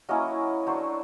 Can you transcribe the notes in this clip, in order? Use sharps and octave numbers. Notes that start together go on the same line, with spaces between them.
F#3 A#3 C#4 E4 D#5
F#3 A3 D4 C5